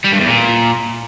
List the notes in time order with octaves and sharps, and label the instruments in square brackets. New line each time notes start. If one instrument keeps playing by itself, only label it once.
[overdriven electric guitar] G3
G2
E2
A#2